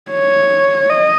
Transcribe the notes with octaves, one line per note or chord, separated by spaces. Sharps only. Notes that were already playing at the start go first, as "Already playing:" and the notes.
C#5
D#5